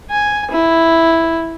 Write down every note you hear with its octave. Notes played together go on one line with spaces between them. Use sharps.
G#5
E4